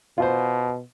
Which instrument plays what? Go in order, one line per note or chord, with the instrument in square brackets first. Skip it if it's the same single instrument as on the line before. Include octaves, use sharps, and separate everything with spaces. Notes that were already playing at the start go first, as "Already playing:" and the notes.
[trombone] B2 [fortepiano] F4 C5